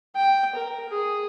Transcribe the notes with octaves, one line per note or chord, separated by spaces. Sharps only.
G5
A#4
G#4